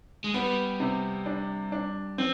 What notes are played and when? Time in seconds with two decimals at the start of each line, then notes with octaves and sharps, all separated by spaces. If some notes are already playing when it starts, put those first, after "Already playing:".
0.24 G#3
0.34 G3 B3
0.80 C3
1.26 D4
1.72 D4
2.18 F3 C4